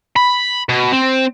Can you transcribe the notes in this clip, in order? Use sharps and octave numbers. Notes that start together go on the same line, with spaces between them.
B5
B2
C4